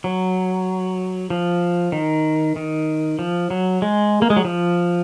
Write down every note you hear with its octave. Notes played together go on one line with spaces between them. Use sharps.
F#3
F3
D#3
D#3
F3
F#3
G#3
A#3
G#3
F#3
F3